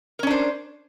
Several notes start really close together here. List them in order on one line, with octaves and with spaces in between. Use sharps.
A#4 C#4 D4 C5